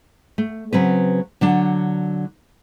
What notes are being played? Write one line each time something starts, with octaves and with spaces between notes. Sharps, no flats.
A3
C#3 F#3 C4 B4
D3 F#3 D4